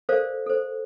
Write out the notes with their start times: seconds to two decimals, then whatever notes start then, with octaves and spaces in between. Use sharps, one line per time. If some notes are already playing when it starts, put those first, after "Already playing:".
0.09 A4 A#4 C5 D5 F5
0.46 A4 C5